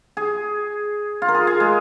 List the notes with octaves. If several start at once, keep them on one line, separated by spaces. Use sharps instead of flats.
G#4
F4
A#4
G#4
G#4
G#3